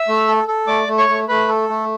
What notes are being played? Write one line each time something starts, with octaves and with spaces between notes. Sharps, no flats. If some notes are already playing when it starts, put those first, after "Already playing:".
Already playing: E5 E6
A3
A4
A4
A3 D5 D6
A3
C#5 C#6
A3
A3 B4 B5
A4
A3